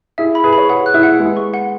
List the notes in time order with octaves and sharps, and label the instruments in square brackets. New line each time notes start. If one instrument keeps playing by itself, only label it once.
[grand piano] E4 G#4 [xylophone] E5
[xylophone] B5
[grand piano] G#4 B4
[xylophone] B5
[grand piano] C#5
[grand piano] G#4 B4 [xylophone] F#5
[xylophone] F#6
[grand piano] E4 G#4
[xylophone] F#5
[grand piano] G#3 B3 [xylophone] F#5
[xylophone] C#6
F#5